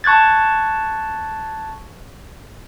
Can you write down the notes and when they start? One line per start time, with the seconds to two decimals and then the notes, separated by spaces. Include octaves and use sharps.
0.04 A5 C#6 F#6 G#6 A6